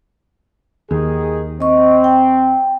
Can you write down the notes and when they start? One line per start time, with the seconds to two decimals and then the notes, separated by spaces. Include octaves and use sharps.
0.91 D#2 D#3 G#4
1.60 C4 D#5 C#6
2.04 G5